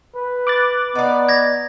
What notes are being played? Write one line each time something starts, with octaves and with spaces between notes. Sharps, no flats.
B4
D6 F#6 A6
B3 D#4 D5
G#6 A#6